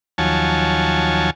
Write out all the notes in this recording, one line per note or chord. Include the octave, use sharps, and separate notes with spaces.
D#2 F3 F#3 C#5 G#5 A5